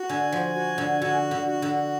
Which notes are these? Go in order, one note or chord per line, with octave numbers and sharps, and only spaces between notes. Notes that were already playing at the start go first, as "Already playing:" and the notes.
Already playing: F#4
D3 G#5
F3
F#4
D3
D3 F#4
D3
F#4
D3